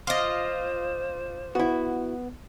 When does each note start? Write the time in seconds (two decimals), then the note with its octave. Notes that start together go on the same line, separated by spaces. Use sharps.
0.07 F4 C5 D#5 C6 D6 A6
1.55 B3 E4 F#4